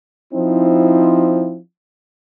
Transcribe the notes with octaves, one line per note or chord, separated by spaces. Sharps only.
F3 C4 D#4 E4